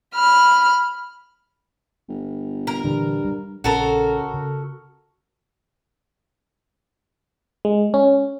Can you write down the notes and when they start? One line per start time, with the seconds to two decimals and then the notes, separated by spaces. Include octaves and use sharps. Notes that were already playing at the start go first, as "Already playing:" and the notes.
0.15 B5 F6
2.09 G1
2.67 A#4
2.84 G2 A#2 D3 E3
3.25 G3
3.64 A#1 C#3 F#4 A4 A#4
4.34 C#3
7.65 G#3
7.94 C#4